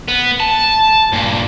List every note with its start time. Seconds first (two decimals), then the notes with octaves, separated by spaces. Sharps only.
0.08 B3
0.40 A5
1.12 G2 A#2